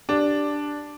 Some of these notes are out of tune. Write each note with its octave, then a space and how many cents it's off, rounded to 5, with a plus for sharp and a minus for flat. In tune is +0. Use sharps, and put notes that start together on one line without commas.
D4 +0 G4 +0